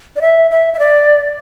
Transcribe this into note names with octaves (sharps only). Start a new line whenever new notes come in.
D5
E5
E5
E5
D5